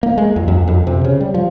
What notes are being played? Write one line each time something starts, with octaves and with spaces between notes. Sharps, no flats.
A#3
G#3
E2
F2
F2
C3
C#3
G3
F3